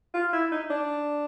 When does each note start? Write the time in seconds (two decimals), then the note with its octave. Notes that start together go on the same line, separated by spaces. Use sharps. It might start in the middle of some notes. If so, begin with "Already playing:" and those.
0.14 F4
0.33 E4
0.52 D#4
0.70 D4